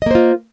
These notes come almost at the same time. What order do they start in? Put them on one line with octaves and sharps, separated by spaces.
D#5 A#3 C5 F4